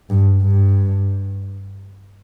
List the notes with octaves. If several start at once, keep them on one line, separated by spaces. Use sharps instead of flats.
G2
G2